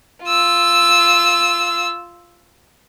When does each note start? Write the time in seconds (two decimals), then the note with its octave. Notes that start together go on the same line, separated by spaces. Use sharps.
0.23 F4 E6